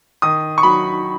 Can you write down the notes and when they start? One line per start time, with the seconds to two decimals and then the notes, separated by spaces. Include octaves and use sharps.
0.22 D#3 D#6
0.58 C#6
0.63 F#3 B5